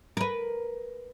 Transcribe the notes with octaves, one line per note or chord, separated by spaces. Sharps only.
A#4 B4